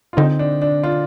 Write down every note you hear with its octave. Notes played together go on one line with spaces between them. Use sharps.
F4
D3 C4 D#4
D4
D4
D4 F4